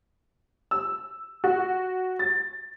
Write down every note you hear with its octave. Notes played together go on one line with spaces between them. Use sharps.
E6
F#4
A6